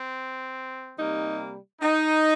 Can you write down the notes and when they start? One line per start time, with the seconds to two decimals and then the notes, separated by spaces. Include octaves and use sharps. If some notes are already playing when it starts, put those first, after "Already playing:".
Already playing: C4
0.97 C3 G3 A#3 D#4
1.81 D#4